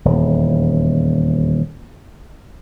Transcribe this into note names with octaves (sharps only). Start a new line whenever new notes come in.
D#1 E2